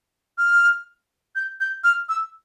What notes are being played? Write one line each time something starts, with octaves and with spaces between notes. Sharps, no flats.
F6
G6
G6
F6
E6